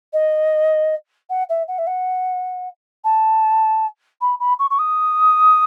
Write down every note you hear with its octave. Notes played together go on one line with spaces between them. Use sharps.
D#5
F#5
E5
F#5
E5
F#5
A5
B5
B5
C#6
C#6
D#6